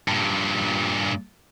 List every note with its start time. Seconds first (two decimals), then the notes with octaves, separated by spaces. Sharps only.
0.08 G2 A#2